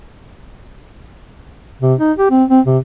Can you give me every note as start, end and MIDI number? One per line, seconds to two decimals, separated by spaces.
1.81 1.94 48
1.99 2.12 63
2.18 2.29 67
2.31 2.44 60
2.50 2.60 60
2.66 2.78 48